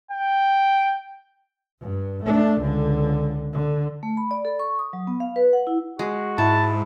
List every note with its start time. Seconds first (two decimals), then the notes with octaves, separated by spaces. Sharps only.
0.11 G5
1.81 G2
2.24 A3 D4
2.61 C#2 D3
3.53 D3
4.03 A3
4.17 B5
4.31 D5
4.45 A4
4.59 C#6
4.79 D#6
4.93 F#3
5.07 B3
5.20 F5
5.36 B4
5.53 F#5
5.67 E4
5.99 G#3 F#4
6.38 G#2 E4 A5